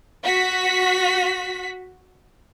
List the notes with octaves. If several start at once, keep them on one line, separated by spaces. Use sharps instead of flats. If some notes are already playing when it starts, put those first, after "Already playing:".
F#4 B6